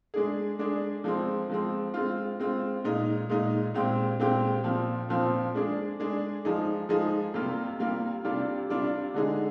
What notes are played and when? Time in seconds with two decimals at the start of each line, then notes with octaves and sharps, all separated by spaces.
0.14 G#3 D4 G#4
0.59 G#3 D4 G#4
1.04 F3 G#3 C4
1.49 F3 G#3 C4
1.94 G#3 C4 F4
2.40 G#3 C4 F4
2.84 A#2 G#3 D#4
3.29 A#2 G#3 D#4
3.74 A#2 G#3 C4 G4
4.20 A#2 G#3 C4 G4
4.64 A#2 F3 C4
5.09 A#2 F3 C4
5.55 G#3 D4 G#4
6.00 G#3 D4 G#4
6.45 F3 G#3 D#4 G#4
6.89 F3 G#3 D#4 G#4
7.34 C3 G3 A#3 F4
7.79 C3 G3 A#3 F4
8.24 C3 G3 D4 F4
8.69 C3 G3 D4 F4
9.14 D3 G#3 D#4 G#4